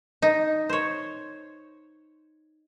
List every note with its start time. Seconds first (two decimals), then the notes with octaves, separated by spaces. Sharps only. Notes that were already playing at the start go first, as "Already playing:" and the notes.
0.22 D#4
0.69 C5 C#5